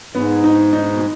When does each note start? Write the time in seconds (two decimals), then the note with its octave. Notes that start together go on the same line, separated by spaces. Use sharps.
0.15 G#2 B3
0.44 D#4
0.73 D#4
0.91 B2